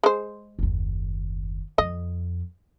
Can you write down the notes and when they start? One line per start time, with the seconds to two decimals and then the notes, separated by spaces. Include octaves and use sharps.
0.03 G#3 C5
0.59 F#1 D#2
1.78 F2 D#5